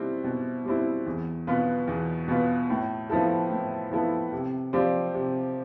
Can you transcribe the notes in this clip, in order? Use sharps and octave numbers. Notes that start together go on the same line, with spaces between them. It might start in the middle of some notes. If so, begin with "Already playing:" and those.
Already playing: B2 G3 C4 E4
B2
G3 C4 E4
E2
B2 B3 F4 B4
E2
B2 B3 F4 B4
A2
F3 B3 E4 A4
A2
F3 B3 E4 A4
C3
F3 C4 G4 D5
C3